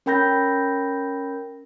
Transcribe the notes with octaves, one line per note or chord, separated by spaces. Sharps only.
C#4 A#4 G5 B5 G6 A#6